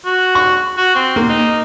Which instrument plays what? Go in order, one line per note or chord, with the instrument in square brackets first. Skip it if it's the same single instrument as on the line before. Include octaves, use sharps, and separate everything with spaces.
[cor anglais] F#4
[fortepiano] C#6
[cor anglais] F#4
C4
[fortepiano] A#3
[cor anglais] D#4